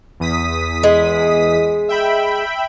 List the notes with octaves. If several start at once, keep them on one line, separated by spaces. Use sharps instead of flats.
E2 D#6 B6
G#3
E5 G5 B5